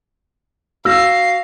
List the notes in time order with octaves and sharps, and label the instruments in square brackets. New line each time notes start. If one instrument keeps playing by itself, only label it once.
[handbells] F#4 A#6 [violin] F5 C7 [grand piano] E6